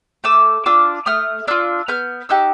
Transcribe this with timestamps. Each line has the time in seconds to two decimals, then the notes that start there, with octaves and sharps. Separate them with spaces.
0.24 A3 D6 E6
0.66 D4 F4 D6 E6
1.06 A3 D#6 F6
1.47 D4 F4 E6 F#6
1.88 B3 F6 G6
2.29 D#4 G4 E6 F#6